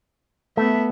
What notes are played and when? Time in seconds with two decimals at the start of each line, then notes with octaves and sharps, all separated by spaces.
0.57 A3 B3 E5